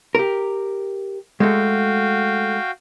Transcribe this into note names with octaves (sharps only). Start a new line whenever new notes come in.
G4 A#4
G#3 A3 F#4 F5 G5